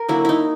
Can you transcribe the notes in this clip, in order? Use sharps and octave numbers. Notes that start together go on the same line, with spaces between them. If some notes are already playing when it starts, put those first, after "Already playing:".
Already playing: A#4
D3 F#3 A#3 E4
D#4 E4